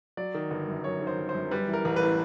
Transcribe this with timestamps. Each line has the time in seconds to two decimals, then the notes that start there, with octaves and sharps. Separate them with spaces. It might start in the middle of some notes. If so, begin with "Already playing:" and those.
0.17 F#3 D5
0.34 D#3
0.51 G1
0.68 F#2
0.84 F#3 C#5
1.01 D#3
1.07 C5
1.18 G1
1.29 C5
1.34 F#2
1.51 G3 B4
1.68 E3
1.73 A#4
1.85 A1
1.96 B4
2.02 A2